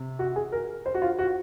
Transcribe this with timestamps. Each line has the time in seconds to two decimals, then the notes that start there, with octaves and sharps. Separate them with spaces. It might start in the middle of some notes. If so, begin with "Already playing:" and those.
Already playing: C3
0.19 F#4
0.36 G#4
0.52 A#4
0.86 C5
0.94 F#4
1.02 F4
1.19 F#4